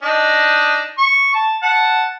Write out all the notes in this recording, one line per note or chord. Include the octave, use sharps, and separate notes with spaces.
D4 D#4 D#5
C#6
A5
F#5 A5